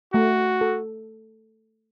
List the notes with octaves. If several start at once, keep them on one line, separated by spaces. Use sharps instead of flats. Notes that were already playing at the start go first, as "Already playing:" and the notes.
A3 F#4
A4